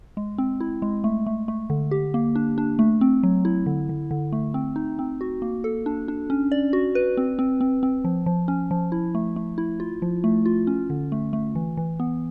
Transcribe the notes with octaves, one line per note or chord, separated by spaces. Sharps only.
G#3
C4
E4
G#3
A3
A3
A3
D3
G4
A#3
D4
D4
A3
C4
F#3
E4
D3
D3
D3
A3
C4
D#4
C4
F#4
A#3
A4
D4
D4
C#4
D5
F#4
B4
C4
C4
C4
C4
F3
F3
C#4
F3
E4
A3
A3
E4
F4
F3
A3
F4
C#4
D3
A3
A3
E3
E3
B3